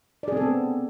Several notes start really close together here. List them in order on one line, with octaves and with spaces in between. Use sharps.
D5 G#4 C4 A4 B3